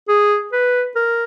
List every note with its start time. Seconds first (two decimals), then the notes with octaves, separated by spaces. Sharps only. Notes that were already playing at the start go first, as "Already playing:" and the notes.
0.08 G#4
0.52 B4
0.96 A#4